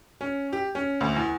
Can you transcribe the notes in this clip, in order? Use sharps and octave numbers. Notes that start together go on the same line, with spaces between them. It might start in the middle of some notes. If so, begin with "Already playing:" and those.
C#4
G4
C#4
D2
E2